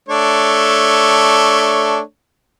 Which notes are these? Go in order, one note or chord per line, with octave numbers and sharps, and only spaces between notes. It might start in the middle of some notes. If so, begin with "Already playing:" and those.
A3 D4 C#5